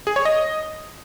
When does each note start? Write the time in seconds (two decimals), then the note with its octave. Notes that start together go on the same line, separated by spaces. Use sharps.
0.07 G#4
0.16 C#5
0.25 D#5